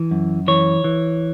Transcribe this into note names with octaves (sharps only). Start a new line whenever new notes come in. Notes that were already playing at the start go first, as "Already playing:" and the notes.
Already playing: E3
F#2
E3 C#5
E3